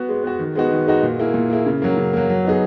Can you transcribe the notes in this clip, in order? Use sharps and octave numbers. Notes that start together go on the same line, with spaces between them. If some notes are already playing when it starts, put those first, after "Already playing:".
Already playing: B3 F#4
G#3
B3 F#4
D#3
G#3 B3 D#4 F#4
D#3
G#3 B3 D#4 F#4
A#2
A#3 E4 G#4
A#2
A#3 E4 G#4
C#3
F#3 A#3
C#3
F#3 A#3
F#3
B3 D#4 G#4